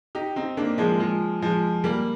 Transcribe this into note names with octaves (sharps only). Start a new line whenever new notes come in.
D#4 G4
C4 D#4
A#3 D4
F3 G#3
F3 G#3
F3 G#3
G3 A#3